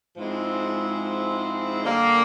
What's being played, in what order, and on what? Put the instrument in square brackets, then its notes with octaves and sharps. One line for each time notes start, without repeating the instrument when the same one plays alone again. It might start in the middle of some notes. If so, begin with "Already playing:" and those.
[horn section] G#2 F3 G#3 C4 E4
D3 G3 A#3